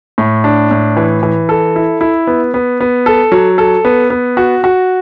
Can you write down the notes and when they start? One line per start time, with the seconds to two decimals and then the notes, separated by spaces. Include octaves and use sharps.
0.18 A2
0.44 D4
0.71 A2
0.97 E3
1.23 E3
1.49 A4
1.76 E4
2.01 E4
2.27 B3
2.54 B3
2.80 B3
3.06 A4
3.32 F#3
3.58 A4
3.85 B3
4.10 B3
4.37 F#4
4.64 F#4